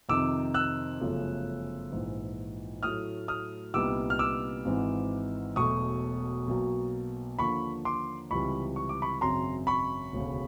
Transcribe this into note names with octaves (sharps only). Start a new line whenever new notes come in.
F2 C3 D#3 D6 E6
E6 F#6
G1 F#2 C#3 F3 A3
A#1 G#2 E3
A2 F#3 A3 D#6 F6
D#6 F6
C2 A#2 G3 B3 D#4 D6 E6
F6
D6 E6
G#1 G#2 E3
E1 E2 B2 F#3 A3 C#6 D#6
B1 B2 F#3 A#3
D#2 D3 F3 A#3 D4 B5 C#6
C6 D6
C#2 C3 E3 G3 B5 C#6
C#6
D6
B5 C#6
G#1 F#2 C#3 A#5 C6
B5 C#6
E1 D2 C#3